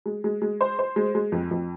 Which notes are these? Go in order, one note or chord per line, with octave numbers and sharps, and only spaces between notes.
G#3
G#3
G#3
C5
C5
G#3
G#3
F2
F2